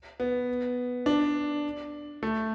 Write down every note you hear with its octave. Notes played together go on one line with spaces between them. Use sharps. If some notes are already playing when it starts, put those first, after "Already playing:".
B3
D4
A3